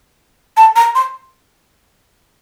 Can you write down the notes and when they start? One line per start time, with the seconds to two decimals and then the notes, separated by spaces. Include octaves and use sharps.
0.57 A5
0.76 A#5
0.95 C6